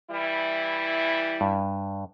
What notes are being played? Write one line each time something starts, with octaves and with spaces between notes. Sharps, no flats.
E3 G3 E4
G2